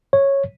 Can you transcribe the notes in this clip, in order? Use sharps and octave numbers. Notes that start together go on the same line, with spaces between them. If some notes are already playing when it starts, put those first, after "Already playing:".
C#5